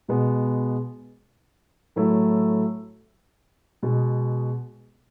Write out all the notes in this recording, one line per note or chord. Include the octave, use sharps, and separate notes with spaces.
B2 G#3 B3
A2 F#3 A3 E4
B2 G#3 B3